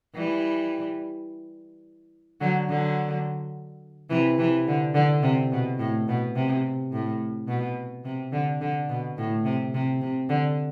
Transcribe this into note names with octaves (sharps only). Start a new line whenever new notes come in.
E3 G3
D3 F#3
D3 F#3
C3 E3
C3 E3
D3
D3
C3
B2
A2
B2
C3
A2
B2
C3
D3
D3
B2
A2
C3
C3
C3
D3